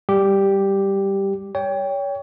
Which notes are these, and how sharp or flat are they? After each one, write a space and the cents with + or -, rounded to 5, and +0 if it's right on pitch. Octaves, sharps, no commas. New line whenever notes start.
G3 +0 G4 +0
C#5 +30 G5 +10